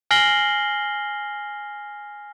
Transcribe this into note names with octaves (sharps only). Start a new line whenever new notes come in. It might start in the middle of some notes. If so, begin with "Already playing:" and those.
G#5 F6 A#6 C7 F#7 G7